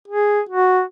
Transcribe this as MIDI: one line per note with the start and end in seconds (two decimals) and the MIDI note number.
0.08 0.41 68
0.49 0.82 66